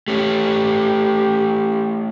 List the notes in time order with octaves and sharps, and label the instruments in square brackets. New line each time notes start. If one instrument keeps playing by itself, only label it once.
[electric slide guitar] A3 C#4 [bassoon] G4